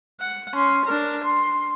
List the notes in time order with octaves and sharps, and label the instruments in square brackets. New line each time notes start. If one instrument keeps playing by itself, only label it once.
[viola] F#5
C#4 C6
D4 A#4
C6